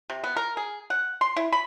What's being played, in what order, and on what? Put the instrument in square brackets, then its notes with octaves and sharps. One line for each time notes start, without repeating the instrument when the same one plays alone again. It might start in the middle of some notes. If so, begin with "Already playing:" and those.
[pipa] C3
B3
A#4
G#4
F#5
C6
E4
B5